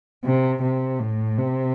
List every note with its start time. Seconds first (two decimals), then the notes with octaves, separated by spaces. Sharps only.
0.25 C3
0.62 C3
1.00 A2
1.38 C3